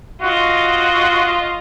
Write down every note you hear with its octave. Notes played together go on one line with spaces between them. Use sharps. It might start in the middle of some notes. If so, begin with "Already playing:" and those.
F4 F#4 D#5